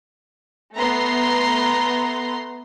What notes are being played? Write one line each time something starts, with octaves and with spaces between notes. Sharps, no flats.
A3 B3 A#5 C6